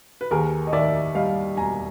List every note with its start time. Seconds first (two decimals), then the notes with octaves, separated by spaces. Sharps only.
0.21 B4
0.31 D#2 G#4 A#4
0.67 D#5
0.73 D#3 D5 E5
1.15 G3 D#5 F5
1.57 E1 G#5 A#5